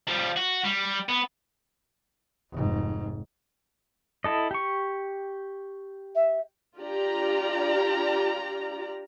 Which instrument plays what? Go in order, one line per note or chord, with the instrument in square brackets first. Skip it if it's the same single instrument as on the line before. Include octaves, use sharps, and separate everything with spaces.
[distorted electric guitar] F3 G3
F#4
G3
B3
[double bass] F1 G#2
[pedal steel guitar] E4 A4 D#5
G4 C#6
[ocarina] E5
[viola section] D4 F4 G4 D5 A#5